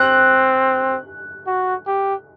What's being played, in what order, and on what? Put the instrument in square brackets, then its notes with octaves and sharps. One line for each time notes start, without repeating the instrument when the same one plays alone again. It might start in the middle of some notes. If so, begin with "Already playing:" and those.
Already playing: [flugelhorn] C4 [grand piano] F#6
[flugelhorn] F#4
G4